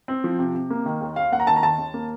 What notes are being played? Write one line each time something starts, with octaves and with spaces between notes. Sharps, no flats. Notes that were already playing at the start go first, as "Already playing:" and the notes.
C4
F3
C3
C3
A#3
D#3
D#2
D#2 F5
A#3 F#5
A#5
D#3 A5
A#5
D#2 A5
D#2
A#3